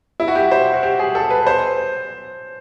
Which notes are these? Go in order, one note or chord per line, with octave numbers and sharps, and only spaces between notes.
E4
F#4
G4
C5
F#4
G4
G#4
A4
B4
C5